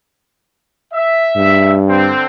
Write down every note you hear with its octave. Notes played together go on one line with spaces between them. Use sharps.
E5
G2
D3 C4